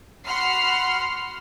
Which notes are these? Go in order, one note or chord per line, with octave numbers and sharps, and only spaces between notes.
F#4 F#5 B5 C6 F6 C7